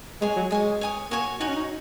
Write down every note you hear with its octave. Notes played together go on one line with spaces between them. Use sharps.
G#3 G#4 C#5 G#5
F#3
G#3 C#5 G#5 D#6
C#5 G#5 D#6
A#3 F#4 C#5 G#5 C#6
D#4 F#4 C#5 G#5 C#6
C#4
D#4